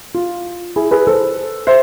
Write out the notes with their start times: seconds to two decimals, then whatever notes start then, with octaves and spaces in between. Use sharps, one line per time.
0.14 F4
0.76 E4 G#4
0.91 G#4 B4
1.07 A4 C5
1.67 C5 E5